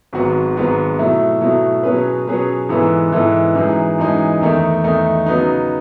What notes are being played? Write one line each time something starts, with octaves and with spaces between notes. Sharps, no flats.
G#1 G#2 F#3 B3 F#4
G#1 G#2 F#3 B3 F#4
B2 F#3 A3 E4
B2 F#3 A3 E4
B2 F#3 C#4 G#4 B4
B2 F#3 C#4 G#4 B4
G#2 E3 B3 E4 A4
G#2 E3 B3 E4 A4
F#2 E3 G#3 D#4
F#2 E3 G#3 D#4
E2 D#3 A3 D#4
E2 D#3 A3 D#4
C#3 F#3 B3 D#4